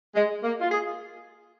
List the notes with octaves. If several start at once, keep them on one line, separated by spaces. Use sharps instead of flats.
G#3
A#3
F4
G#4